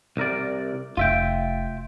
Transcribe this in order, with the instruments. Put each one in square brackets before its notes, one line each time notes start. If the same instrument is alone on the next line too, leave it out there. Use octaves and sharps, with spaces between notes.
[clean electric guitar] C2 A#4 D5
[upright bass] F1 [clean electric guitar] F4 E5 G5